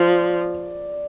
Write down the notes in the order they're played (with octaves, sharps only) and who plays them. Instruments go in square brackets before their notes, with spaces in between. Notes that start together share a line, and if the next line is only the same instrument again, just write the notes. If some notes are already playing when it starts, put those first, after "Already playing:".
Already playing: [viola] F3 [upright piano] D5